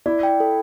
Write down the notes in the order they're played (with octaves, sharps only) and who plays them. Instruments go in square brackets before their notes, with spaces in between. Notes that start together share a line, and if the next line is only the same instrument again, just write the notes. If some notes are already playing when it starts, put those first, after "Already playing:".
[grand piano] E4 [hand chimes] D5
[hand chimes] G5
A4